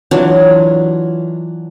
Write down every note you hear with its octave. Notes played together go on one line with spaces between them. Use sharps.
E3 F#3 D4 F4